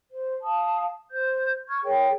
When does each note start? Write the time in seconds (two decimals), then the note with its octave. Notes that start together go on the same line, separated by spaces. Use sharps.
0.08 C5
0.43 F5 A5 D#6
1.10 C5 G6
1.68 C#6 F6 G#6
1.83 G#4 A#4 C#5 G5